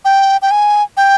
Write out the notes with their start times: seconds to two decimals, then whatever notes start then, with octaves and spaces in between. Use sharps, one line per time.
0.05 G5
0.42 G5
0.51 G#5
0.97 G5